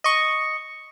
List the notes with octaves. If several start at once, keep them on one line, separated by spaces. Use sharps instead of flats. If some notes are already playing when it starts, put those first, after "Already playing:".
D#5 C#6